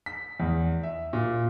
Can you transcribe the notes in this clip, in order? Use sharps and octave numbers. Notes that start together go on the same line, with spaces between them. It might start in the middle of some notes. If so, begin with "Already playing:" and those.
B6
E2
E5
A#2